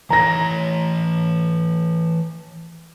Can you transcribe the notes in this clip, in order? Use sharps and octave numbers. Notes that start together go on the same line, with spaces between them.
E3 C#5 A#5 A#6